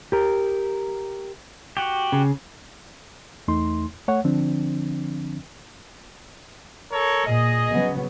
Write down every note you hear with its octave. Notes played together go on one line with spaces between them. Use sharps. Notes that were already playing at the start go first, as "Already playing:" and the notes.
G4 A#4
F#4 G4
C#3
E2 A3 D#4 C6
A3 C#5 F#5
D3 F3 C4 D4
A4 A#4 C#5
A#2 G#4 D#5
C#3 F#3 B3